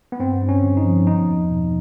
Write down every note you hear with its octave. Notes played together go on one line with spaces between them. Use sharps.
B3
G2 C4
G2
C#4
D3
D#4
F3
B3 D#4
E2
B2